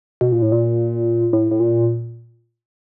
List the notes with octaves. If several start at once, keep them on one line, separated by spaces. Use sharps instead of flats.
B2
A#2
A2
A#2
A2
A2
A#2